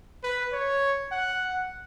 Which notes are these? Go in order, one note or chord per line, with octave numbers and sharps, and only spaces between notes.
B4
C#5
F#5